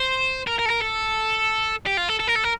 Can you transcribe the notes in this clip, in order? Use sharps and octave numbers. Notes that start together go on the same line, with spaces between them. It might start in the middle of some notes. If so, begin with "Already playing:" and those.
Already playing: C5
A#4
A#4
A4
A#4
A4
G4
F4
A4
A4
A#4
A4
A#4